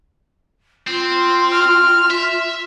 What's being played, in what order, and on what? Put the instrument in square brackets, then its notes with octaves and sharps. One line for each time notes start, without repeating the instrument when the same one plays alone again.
[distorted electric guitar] C4 [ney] F4
[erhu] F6
[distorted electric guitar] E5